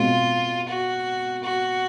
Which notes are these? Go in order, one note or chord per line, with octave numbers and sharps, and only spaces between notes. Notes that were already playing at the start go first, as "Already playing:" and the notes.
Already playing: B2 G#3 C4 F4
F#4
F#4